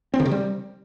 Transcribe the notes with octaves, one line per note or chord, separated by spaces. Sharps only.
C4
D3
C3
G3